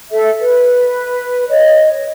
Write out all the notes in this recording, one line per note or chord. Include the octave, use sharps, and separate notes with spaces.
A4 E5
B4
C#5 D#5